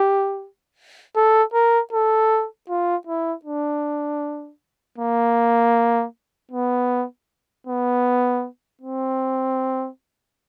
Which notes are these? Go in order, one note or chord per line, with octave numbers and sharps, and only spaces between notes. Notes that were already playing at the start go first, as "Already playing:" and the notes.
Already playing: G4
A4
A#4
A4
F4
E4
D4
A#3
B3
B3
C4